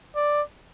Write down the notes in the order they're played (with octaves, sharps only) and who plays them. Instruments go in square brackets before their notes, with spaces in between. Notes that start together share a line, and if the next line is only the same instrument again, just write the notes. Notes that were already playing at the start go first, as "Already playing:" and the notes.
[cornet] D5